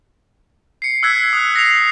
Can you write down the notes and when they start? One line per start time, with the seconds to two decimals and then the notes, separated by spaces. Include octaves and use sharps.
0.82 C7 C#7
1.03 E6 F#6 G#6 B6
1.33 D#6 F#6
1.55 A#6 C7 F7